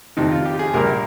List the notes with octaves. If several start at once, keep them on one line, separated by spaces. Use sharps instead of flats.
F2 C3 D#3 D#4
F4
G4
G#4
A#1 A#2 G3 A#4